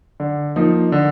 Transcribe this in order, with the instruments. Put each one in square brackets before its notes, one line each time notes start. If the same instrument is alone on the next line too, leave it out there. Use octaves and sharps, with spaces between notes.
[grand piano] D3
F3 A#3 D#4
D3